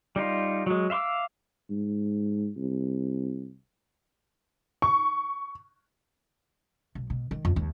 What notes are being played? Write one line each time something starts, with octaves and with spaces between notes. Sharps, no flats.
G3 D#4 F4
F#3 G#3
E5 F5 C6 D6 E6
G#2
C2
C#6
B1
B2
D#3
F2
D#2